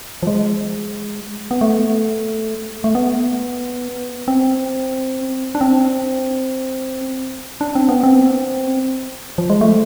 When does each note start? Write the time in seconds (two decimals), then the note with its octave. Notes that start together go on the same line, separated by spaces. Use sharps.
0.23 F3
0.27 G#3
1.51 B3
1.61 A3
2.84 A3
2.95 B3
4.28 C4
5.55 D4
5.61 C4
7.61 D4
7.75 C4
7.89 B3
8.03 C4
9.38 F3
9.50 G#3
9.61 A3